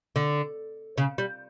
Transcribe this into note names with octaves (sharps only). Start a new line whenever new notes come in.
D3
C#3
G3